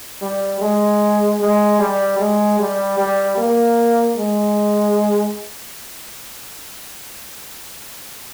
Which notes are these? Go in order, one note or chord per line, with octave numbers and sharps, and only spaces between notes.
G3
G#3
G#3
G3
G#3
G3
G3
A#3
G#3